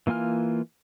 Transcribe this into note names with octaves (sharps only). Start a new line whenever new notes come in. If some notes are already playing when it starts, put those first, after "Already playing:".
E3 A#3 F4 G#5 F6